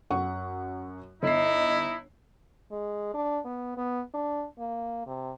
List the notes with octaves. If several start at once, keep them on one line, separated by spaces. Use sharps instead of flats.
F#2 F#5 C#6
G1 D#4 E4 D#5 C7
G#3
D4
B3
B3
D4
A#3
C3